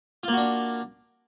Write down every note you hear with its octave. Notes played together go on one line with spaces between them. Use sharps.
A#3 D4 F4 F#4